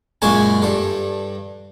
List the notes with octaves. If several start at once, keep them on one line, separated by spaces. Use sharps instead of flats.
F#2 A#2 G#3 C#4 G#5 A5
G2 A4